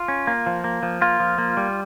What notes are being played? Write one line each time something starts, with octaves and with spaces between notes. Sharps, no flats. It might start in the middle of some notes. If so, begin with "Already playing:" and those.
Already playing: F4
C#4
A#3
F3
A#3
F3
A#3 F4
F3
A#3
G3